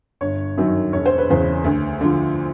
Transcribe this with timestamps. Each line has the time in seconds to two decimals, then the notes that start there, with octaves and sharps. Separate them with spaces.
0.21 G1 C#5
0.57 F#2 D#3 F#3
0.92 E1 C#5
1.06 C5
1.18 B4
1.29 E2 C#3 C5
1.64 D2
2.01 D3 F3